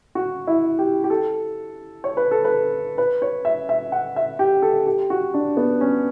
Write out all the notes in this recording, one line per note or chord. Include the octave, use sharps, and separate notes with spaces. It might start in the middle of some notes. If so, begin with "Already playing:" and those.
F#4
E4
G4
G4
A4
C#5
B4
A4
B4
B4
C#5
E5
E5
F#5
E5
G4
A4
G4
F#4
D4
B3
C#4